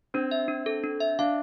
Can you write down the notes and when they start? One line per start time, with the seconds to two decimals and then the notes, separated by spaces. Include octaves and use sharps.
0.14 C4 D4
0.31 E5
0.48 D4
0.66 A4
0.84 D4
1.00 E5
1.19 D4 F5